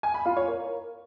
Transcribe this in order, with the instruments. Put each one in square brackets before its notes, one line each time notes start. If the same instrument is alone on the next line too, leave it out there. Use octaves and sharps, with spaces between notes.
[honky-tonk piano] G#5
B5
F4
C#5
A#4